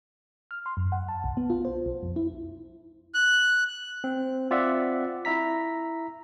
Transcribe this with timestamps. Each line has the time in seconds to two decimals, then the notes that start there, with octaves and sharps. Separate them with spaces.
0.51 F6
0.66 C6
0.77 F#2
0.92 F#5
1.08 A5
1.24 B1
1.37 B3
1.50 F4
1.65 C5
1.86 B1
2.03 F2
2.16 E4
3.14 F#6
4.04 C4
4.50 C4 F4 D5 E5 F#5
5.25 E4 E5 A#5 B6